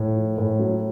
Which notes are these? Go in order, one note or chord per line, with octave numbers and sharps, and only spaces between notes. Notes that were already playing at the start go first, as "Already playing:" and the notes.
Already playing: A2
F3
A2
F#3